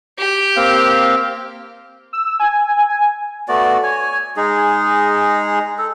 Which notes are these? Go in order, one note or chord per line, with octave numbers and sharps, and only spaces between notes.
G4
A#3 C4 F5
E6
G#5
G#5
A3 B3 F#4 D5
C#5 G#5
G#3 D#4 G#4
A4